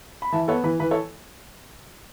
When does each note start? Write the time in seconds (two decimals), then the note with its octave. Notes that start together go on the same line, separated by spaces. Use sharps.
0.22 B5
0.32 E3 E5 A5
0.48 B3 A4 C#5
0.64 E3 B4
0.80 E3 B4
0.91 A4 C#5